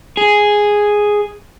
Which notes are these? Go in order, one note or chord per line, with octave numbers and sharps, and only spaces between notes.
G#4